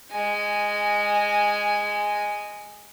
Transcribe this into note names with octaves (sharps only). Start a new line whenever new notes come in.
G#3 G#5